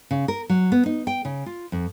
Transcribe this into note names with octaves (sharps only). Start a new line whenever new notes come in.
C#3
A#4
F#3
B3
D#4
G5
C#3
F4
F2